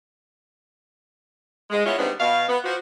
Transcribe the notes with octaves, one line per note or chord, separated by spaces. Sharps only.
G#3
G#3 B3 C#4 E4 F4 C#5
D#3 G3 G#3 B3 C4 D4
B2 F5
B3
F3 F#4